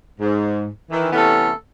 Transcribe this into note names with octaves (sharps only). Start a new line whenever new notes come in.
G#2
D#3 E3
C3 E3 A3 B3 C#4 A4